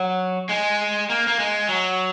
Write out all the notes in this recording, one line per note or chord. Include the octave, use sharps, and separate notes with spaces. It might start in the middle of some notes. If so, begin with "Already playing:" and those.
Already playing: F#3
G#3
A#3
A#3
G#3
F#3